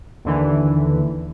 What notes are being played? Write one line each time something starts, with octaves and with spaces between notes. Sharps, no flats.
D#2 D3 E3